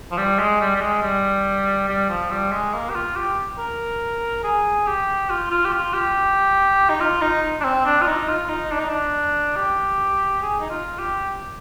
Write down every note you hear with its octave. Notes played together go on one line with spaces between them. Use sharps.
F3
G3
G#3
G3
G3
G#3
G3
G3
F3
G3
G#3
A#3
G4
F4
G4
A#4
G#4
G4
F4
F4
G4
F4
G4
D#4
F4
D#4
D4
C4
D4
F4
D#4
F4
D#4
D4
D#4
D4
G4
G#4
D#4
F4
G4